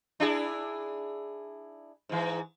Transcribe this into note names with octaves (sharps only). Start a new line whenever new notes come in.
D4 E4 G#4
G#2 E3